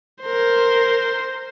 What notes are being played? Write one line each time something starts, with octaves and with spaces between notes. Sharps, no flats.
A#4 C5